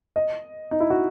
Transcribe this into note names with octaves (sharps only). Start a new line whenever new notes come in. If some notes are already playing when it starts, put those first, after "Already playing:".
D#5
D#4
E4
F#4